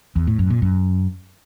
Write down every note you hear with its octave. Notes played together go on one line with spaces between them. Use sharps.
E2
A2
F#2
A#2
F#2